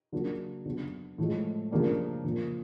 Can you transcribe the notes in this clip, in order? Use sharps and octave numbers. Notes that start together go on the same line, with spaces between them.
C#3 F#3 A#3 D4 F#4
C#3 F#3 B3 D4 F#4
A2 F3 G#3
C#3 F3 A#3 D4 G4
A#2 F3 A#3